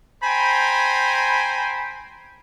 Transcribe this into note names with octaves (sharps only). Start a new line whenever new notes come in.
C5 G5 G#5 A#5 B5